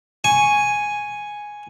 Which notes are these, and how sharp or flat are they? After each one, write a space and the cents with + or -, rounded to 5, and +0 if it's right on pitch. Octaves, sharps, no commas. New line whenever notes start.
G#5 +0 C#6 +0